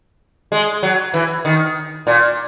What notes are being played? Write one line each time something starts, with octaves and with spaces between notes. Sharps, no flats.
G#3
F#3
E3
D#3
A#2